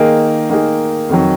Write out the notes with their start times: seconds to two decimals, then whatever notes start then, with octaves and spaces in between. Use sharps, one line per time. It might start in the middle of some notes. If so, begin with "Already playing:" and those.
Already playing: D#3 A#3 D#4 G#4
0.50 D#3 A#3 D#4 G#4
1.09 F2 D#3 F#3